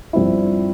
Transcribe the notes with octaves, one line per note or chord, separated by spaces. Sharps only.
G2 F3 C4 E4